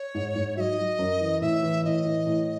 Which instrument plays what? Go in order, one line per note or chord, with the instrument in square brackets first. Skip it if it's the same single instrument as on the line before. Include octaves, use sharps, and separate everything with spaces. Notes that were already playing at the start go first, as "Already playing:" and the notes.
Already playing: [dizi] C#5
[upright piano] G#2
G#2
[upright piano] F#3 [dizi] E5
[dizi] D#5
[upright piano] F#3
F#2
E3
[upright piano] A2 [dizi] E5
[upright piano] E3
[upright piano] A2 [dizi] D#5
[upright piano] E3
A2